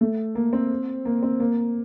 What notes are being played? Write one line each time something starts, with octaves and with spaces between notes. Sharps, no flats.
A3
A#3
C4
A#3
C4
A#3